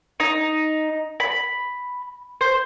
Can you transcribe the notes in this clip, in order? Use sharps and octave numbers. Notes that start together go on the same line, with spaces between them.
D#4
B5
C5